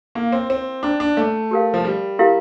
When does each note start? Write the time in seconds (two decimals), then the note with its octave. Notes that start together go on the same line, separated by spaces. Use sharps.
0.15 A#3 E4 A#4 F5 A#5
0.32 C4
0.50 C4
0.83 D4 C5 G5 A#5
1.00 D4
1.17 A3
1.51 G4 A#4 F5
1.74 F3
1.85 G3
2.19 E4 G4 A#4 F5